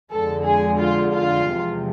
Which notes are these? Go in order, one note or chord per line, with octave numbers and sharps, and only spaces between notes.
F2 D3 G#3 A4
G#4
F4
F4
E2 C3 F3 G#3